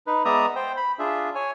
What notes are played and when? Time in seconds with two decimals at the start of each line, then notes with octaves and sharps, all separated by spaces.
0.07 D#4 B4
0.25 G#3 B3 D5 E5 A#5 D#6
0.56 C5 G5
0.77 B5
0.99 D4 F4 G#4 E5
1.35 C#5 G#5